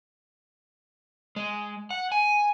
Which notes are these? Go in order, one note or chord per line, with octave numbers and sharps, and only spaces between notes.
G#3
F#5
G#5